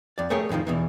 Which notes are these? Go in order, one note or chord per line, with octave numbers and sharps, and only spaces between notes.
F2 D5
A3 G4 G#4 A#4 C#5
F2 A2 C3 D#3 F3
E2 B2 E3